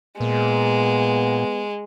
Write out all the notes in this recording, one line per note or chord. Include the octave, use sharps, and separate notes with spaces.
A#2 G#3 B3